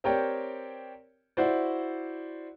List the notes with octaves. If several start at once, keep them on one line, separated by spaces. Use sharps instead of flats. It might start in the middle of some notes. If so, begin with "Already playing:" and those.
C4 G4 A#4 C#5 D5 G5
E4 F#4 C5 D5